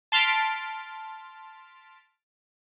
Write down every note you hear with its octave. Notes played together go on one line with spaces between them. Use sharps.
A5 C6 F6 A6 B6 D7